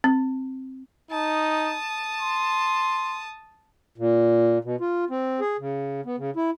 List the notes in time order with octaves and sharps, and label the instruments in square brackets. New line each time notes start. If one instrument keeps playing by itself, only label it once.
[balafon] C4
[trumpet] D#4 [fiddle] A5 D#6
[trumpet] C6
[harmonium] A#2
B2
F4
C4
G#4
C#3
B3
C#3
E4